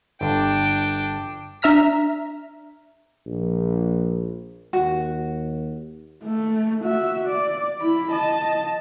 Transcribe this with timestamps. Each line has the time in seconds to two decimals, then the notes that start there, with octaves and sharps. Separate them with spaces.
0.21 G1 D4 G5
1.62 D4 E5 A#5 F6 B6
3.26 A#1
4.73 D#2 F#4
6.23 A3
6.84 F#4 E5
7.28 D5
7.81 E4 B5
8.12 D#5 A5